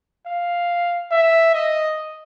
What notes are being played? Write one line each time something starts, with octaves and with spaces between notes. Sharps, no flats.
F5
E5
D#5